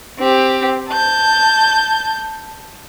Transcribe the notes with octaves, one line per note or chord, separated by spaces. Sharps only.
C4 G4
A5 G6